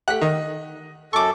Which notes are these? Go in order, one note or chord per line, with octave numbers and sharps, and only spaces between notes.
A3 G4 F#5 F#6 B6
D#3 D#5
F#2 A4 C#6 D6